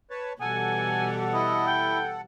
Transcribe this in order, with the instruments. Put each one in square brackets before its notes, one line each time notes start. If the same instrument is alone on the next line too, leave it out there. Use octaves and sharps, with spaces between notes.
[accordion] B4 C#5 A5
[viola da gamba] B2 E3 G3 [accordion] A4 F#5 [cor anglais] G#5
[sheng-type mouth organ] E4 [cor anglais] D#5
[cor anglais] G5